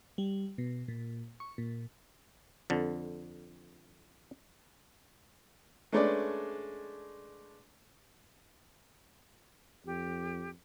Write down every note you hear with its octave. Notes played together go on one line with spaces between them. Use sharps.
G3
B2
A#2
C#6
A#2
F2 D3
G#3 A3 C#4 D4 B4 D5
F2 G4